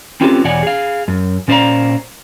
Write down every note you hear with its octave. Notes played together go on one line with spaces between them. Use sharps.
C4 C#4 F4 G4 A4 B4
E2 B2 C#5 D5 F#5 G#5
G#4 F5
F#2
A#2 C#4 C5 D5 F5 A#5